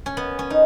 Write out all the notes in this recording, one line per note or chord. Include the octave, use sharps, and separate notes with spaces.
C#4
B3
C#4
D#4